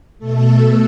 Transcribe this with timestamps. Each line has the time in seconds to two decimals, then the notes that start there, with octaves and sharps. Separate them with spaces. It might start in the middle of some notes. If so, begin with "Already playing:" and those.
0.19 B2 A3 A4